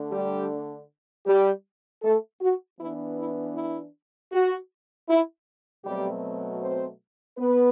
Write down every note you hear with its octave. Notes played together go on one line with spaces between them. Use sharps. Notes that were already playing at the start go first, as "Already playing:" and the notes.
Already playing: D3 A3 D4
G3 G4
G3 G4
A3 A4
F#4
E3 B3 D4 E4
E4
E4
F#4
E4
B2 F#3 G3 A3 C4 G4
C4 C5
B3 B4